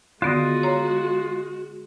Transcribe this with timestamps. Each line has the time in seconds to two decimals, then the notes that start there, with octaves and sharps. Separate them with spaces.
0.22 D3 D#3 G#3 B3 F4 F#4 D#5
0.63 C#5 A#5